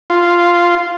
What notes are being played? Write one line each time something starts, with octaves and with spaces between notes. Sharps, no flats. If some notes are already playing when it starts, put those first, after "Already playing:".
F4